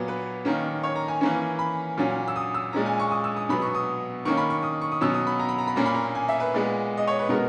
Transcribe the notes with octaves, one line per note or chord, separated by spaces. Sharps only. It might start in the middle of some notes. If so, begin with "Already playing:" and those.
Already playing: A#2 F#3 B3
B4
D#3 A#3 C#4
C#5
A#5
G#5
E3 A#3 C#4
B5
A#2 F#3 C#4
E6
D#6
E6
A#2 G#3 C#4 A#5
G#5
C#6
D#6
E6
D#6
B2 F#3 B3 B5
C#6
D#6
D#3 A#3 C#4 C#6
B5
C#6
D#6
C#6
D#6
B2 F#3 C#4 E6
D#6
B5
A#5
B5
A#5
B5
A#2 A#3 C#4 A#5
B5
A#5
G#5
E5
B4
A#2 G#3 B3
D#5
C#5
B4
B2 G#3 B3 A#4